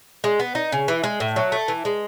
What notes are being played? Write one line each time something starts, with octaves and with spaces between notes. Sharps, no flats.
G#3
B3
D#4
C#3
E3
G#3
A2
F#3
A3
E3
G#3